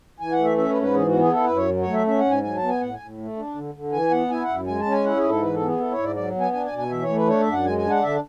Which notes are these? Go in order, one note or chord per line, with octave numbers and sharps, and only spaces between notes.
E3 G#5
F#5
A3
E5
C#4 E5
B4
G#2
B4
E3 G#4
F#4
B3
G#4
E4 A4
B4
F#2
C#5
F#3
C#5
A3
E5
C#4 E5
F#5
G#2
G#5
F#3 G#5
A5
B3
G#5
A2 F#5
G#5
A2
A3
D4
D3
D3
E3 G#5
B3 F#5
E4 G#5
F#5
F#2
G#3 G#5
A5
C#4
G#5
E4 F#5
G#4
G#2
A4
E3 B4
A4
B3
G#4
E4 A4
C#5
G#2
D5
F#3 D5
B3
G#5
D4 G#5
G#5
B2
G#5
E3 E5
C#5
A3
B4
D4 C#5
E5
F#2
F#5
G#3 G#5
G#5
D4
F#5
D3 E5